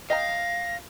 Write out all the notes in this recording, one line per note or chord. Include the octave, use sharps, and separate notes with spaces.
D#5 F5 G5 A#5 A#6